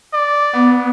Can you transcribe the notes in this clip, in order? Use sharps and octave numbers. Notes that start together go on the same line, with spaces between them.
D5
B3